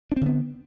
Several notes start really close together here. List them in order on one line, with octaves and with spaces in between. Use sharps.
D4 C4 D3 B3